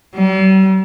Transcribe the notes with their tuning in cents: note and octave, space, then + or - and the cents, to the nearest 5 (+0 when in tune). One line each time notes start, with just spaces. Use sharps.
G3 -45